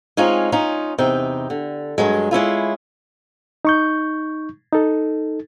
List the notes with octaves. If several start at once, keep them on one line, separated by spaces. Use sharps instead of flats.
G#3 C4 C#4 D#4 F4 G#4
C#4 D#4 F4
E2 C3 D#4 G5
D3
G2 F#3 G#3
G#3 C#4 E4 F4
D#4 C#6 G6
D#4 A4